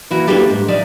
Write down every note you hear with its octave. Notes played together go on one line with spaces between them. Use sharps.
E3 A#3 E4 F#4
A#3 B3 D4 E4 G4 A4
G#2
F3 D#4 D5 E5